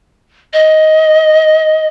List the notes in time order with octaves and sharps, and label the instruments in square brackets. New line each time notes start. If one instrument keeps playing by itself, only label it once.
[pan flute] D#5